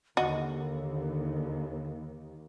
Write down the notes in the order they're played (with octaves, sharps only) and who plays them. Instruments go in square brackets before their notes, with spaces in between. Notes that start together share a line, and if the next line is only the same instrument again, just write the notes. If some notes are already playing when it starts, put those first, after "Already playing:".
[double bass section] D#2 [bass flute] D3 [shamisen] F#4 D#5